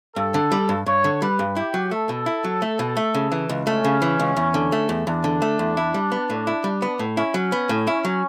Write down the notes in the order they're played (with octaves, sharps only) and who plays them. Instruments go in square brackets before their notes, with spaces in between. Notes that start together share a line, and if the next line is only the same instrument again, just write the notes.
[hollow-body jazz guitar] G2 [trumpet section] A4
[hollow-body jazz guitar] D3
G3
G2
[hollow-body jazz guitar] G2 [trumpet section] C#5
[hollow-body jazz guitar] D3
[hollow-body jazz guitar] G3 [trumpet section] B4
[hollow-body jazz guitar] G2
[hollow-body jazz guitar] E4 [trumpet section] G4
[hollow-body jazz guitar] F#3
[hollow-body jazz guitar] A3 [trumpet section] A4
[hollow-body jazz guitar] B2
E4
F#3
A3
B2
A3
C#3
E3
C#2
[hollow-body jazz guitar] A3 [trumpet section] C#4
[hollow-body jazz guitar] C#3
E3
C#2
E2
D3
A3
E2
[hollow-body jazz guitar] E2 [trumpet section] D4
[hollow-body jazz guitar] D3
A3
E2
E4
G3
B3
A2
E4
G3
B3
A2
[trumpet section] C#4 [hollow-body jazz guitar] E4
[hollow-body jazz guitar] F#3
B3
A2
[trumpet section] C#4 [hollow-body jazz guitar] E4
[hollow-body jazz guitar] F#3